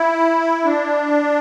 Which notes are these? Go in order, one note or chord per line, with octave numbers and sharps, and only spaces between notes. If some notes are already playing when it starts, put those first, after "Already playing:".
Already playing: E4
D4